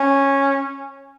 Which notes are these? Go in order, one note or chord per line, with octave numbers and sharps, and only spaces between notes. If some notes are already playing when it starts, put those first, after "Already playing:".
Already playing: C#4